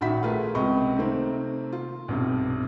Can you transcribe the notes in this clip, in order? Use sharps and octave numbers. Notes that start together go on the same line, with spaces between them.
A#1 D#3 F#4 E5 B5 B6
A3 F4 G#4 A#4 B4
C#2 C3 D#5 B5 C#6
C3 D#3 A3 A#3 C4
F4
B1 G2 C3